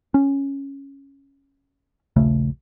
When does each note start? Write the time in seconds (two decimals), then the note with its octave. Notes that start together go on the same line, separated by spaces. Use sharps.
0.14 C#4
2.16 A#1 D#2 C#3 A3